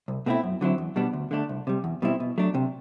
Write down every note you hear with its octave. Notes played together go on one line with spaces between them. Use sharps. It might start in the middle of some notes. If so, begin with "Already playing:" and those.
C2
B2 A3 C4 E4
F#2
D3 F#3 C4 E4
E2
B2 G3 B3 D4
D2
D3 A3 D4
C2
C3 G3
E2
B2 G3 C4 E4
B2
F#3 A3 D4
C3